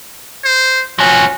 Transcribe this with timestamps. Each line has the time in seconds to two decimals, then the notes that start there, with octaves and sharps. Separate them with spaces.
0.44 C5
0.99 F3 C#4 F#4